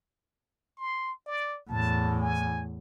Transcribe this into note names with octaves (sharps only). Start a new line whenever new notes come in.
C6
D5
E2 A2 A5
G#5